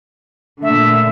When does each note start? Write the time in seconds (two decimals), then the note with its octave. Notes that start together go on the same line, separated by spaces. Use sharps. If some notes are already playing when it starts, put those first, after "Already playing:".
0.62 A#2 D3 A3 E5